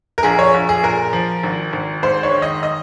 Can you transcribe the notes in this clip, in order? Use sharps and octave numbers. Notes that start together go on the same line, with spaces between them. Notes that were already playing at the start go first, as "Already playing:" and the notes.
A#4
A#1 G#4
C#5
A#1
G#4
A#2 A#4
F3
G#1
G#1
G#2 C5
C#5
D#3
D#5
D#5